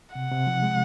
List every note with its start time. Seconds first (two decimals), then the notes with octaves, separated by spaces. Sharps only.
0.15 C3 F#5
0.31 C3
0.47 F3
0.63 G#3